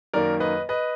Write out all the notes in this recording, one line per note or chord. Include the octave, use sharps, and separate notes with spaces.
F#2 D#3 A#3 A#4 D5
B4 D#5
B4 D#5